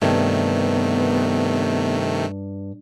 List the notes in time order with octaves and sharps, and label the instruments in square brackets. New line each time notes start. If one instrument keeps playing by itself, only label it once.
[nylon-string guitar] G2 [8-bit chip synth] C3 D#3 A3 [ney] B3